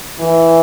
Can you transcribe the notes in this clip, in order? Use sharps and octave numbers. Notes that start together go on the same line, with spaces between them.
E3